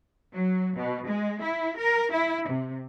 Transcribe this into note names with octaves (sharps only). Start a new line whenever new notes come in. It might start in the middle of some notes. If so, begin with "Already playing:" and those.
F#3
B2
G#3
E4
A#4
E4
C3